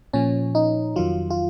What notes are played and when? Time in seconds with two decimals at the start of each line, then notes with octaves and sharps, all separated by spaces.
0.13 A#2 F3 C#4
0.55 D#4
0.96 F2 D#3 F#3 F4
1.30 F4